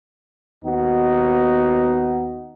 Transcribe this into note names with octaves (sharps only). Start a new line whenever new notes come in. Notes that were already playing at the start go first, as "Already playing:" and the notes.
D#2 B3 D#4 F#4